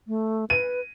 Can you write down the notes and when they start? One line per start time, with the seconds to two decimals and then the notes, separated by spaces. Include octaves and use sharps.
0.08 A3
0.50 B4 D#7